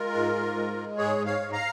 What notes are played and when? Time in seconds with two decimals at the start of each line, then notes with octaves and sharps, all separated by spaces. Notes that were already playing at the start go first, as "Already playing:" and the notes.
Already playing: G#3 F4 A#4
0.15 G#2
0.36 G#2
0.56 G#3
0.77 G#3
0.97 G#2 G#4 C#5
1.18 G#2
1.26 C#5 F5
1.40 G#2
1.52 F5 A#5